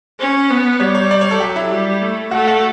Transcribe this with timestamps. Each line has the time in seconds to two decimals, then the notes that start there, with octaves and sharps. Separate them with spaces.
0.20 C#4
0.50 B3
0.80 G3 C#5
0.95 C#5
1.11 D5
1.21 C#5
1.31 A4
1.40 F#3 G4
1.56 E4
1.71 G3
2.02 A3
2.31 A3 F#4
2.47 F#4